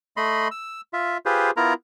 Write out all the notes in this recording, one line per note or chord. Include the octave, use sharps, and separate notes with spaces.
A3 D#5 B5 C6
E6
F4 E5
F4 G4 G#4 B4 C5
B3 E4 F4 A#4 A#5